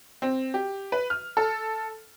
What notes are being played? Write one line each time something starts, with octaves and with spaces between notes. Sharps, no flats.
C4
G4
B4
F6
A4